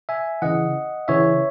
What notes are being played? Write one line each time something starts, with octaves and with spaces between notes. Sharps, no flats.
E5 G#5
C#3 E3 D#5 F#5
C#3 E3 C#5 E5